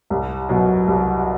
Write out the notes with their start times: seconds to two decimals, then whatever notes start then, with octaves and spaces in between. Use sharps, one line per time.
0.10 C2
0.49 B2 F#3
0.87 C2